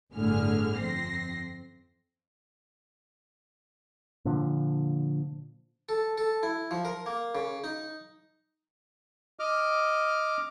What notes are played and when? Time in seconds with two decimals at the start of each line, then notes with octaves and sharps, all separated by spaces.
0.14 G1 A2 D3 G#4 F6
0.80 F2 C4 A#6 C7
4.25 A#2 D3 F3
5.89 A4
6.18 A4
6.43 E4
6.71 F3
6.85 A#4
7.06 A#3
7.35 C#3
7.64 D#4
9.39 D#5 D6 F6